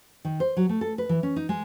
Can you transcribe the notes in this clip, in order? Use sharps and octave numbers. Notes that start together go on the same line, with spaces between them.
D#3
C5
F#3
A3
A4
B4
E3
C#4
D#4
G#3